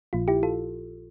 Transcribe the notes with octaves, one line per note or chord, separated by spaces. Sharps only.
A#1 A#2 F3 F4
E4 G4
F4 A4